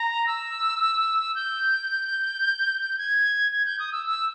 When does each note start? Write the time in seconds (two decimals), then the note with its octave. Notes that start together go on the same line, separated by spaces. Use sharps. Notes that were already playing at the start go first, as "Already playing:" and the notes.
Already playing: A#5
0.27 E6
1.35 G6
2.98 G#6
3.52 G#6
3.66 G6
3.79 D#6
3.92 E6
4.06 E6